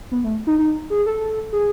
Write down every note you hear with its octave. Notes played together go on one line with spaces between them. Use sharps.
B3
A3
D#4
D#4
G#4
A4
G#4